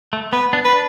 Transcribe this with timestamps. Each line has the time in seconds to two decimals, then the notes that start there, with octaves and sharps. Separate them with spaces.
0.13 A3
0.33 B3 B4
0.53 B3 D4
0.65 B4
0.73 D4